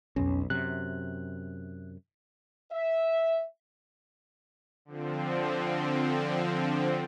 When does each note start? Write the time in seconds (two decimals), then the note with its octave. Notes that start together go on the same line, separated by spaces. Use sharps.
0.16 B1 F2 C#4
0.50 F#2 C3 F#6
2.72 E5
4.85 D3 F3 C4